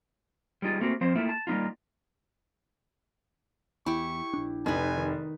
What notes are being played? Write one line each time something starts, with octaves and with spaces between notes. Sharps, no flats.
G3 G#3 D#4 F4
A3 A#3 C4 F#4
F3 C4 C5
A3 A#3 E4 F4
A5
G3 A#3 B3 D#4 F4
E2 E4 G4 C#6
A#1 D4
F1 D#4 B4 G#5
D#3